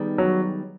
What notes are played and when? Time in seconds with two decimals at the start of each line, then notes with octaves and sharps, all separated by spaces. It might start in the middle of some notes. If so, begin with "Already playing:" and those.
Already playing: D#3 G3 B3 D#4 G#4
0.18 F#3